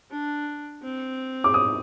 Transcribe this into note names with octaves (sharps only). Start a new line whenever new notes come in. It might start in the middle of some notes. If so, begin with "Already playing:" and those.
D4
C4
D6
D#6